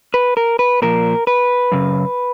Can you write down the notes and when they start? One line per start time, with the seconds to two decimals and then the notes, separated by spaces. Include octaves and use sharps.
0.14 B4
0.37 A#4
0.59 B4
0.82 A#2 F3 A#4
1.27 B4
1.72 F#2 C#3